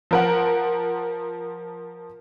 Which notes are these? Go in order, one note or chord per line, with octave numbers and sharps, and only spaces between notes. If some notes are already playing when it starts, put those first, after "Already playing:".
F3 A#4 F#5